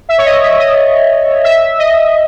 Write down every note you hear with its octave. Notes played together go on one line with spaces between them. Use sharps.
E5
C#5
D#5
E5
D#5
E5
D#5